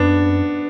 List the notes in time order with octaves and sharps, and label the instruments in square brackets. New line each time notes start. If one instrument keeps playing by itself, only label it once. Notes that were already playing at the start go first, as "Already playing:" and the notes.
Already playing: [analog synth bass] F#2 [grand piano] B3 D4